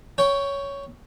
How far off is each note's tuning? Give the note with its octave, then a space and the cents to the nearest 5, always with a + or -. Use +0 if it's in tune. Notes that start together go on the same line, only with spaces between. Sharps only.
C#5 +10 G5 +0